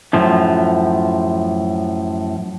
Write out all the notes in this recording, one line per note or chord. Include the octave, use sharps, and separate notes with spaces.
F#2 A2 F3